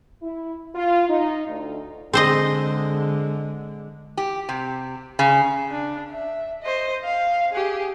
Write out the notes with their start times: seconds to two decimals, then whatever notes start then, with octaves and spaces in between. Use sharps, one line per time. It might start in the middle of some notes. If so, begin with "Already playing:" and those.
0.23 E4
0.75 F4
1.09 D#4
1.48 D2
2.13 D3 G#3 C4 G#4 C5 D#5
4.17 G4
4.49 C3
5.19 C#3
5.71 D4
6.10 E5
6.62 C5 D#5
7.04 F5
7.52 G4 G#4